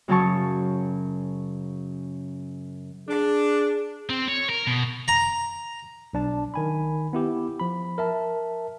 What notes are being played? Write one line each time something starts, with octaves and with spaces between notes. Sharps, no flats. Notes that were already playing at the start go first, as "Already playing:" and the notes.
F#2 C#3 F#3 A5 C#6
D4 G#4
C4
C#5
A#4
B2
A#5
B1 D4 A5
D#3 G#5 B5
B3 E4 G4
F3 B5
A#4 E5 A5